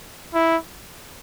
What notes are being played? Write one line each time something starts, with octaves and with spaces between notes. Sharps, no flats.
E4